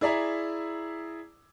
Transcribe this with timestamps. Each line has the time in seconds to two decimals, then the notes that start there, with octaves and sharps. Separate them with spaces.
0.01 E4 G#4 D5 E5 A#5